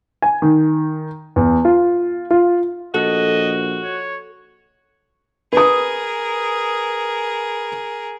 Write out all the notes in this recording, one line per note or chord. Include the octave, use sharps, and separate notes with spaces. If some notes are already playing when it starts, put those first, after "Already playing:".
G#5
D#3
E2
F4
F4
A#1 F#4 A4 D#5
C#5
G#4 A#4 B4 D#6